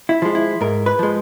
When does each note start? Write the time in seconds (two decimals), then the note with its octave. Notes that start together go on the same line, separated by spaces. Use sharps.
0.09 E4
0.22 F3 G#3
0.35 E4
0.61 G#2 A#4
0.86 B4
0.99 F3 G#3